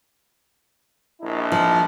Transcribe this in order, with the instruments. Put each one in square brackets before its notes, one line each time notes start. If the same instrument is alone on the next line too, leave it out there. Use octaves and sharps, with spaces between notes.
[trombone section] A#1 D#4 E4
[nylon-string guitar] F3